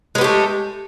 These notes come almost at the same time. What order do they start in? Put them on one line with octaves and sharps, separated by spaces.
G#3 B3 G4 A3